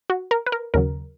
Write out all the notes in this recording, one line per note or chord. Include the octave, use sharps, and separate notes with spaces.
F#4
A#4
B4
A#4
D#2 C#3 F#3 A#4